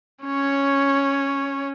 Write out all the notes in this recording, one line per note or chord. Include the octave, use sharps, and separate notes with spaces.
C#4 C#5